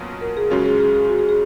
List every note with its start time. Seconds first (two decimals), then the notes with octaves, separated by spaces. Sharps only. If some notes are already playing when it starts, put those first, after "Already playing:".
Already playing: B2 F#3 A#3 C#4 F4
0.21 A#4
0.37 G#4
0.50 F#2 C#3 G#3 C#4 F4 F#4
0.66 G#4
0.80 G#4
0.95 G#4
1.09 F#4
1.19 G#4
1.29 G#4